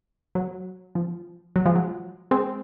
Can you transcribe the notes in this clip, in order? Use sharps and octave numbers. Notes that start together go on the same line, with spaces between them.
F#3
F3
F#3
F3 G#3
F#3
G#3 C4